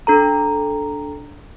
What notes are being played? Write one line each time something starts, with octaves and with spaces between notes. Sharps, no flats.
D4 A4 A#5